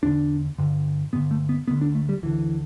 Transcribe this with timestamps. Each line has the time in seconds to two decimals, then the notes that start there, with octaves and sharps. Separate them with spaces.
0.03 E2 D3 D4
0.58 G2 D3
1.13 G2 D3 B3
1.31 A3
1.49 B3
1.68 D2 D3 B3
1.81 D4
1.95 A3
2.09 G3
2.23 D2 D3 E3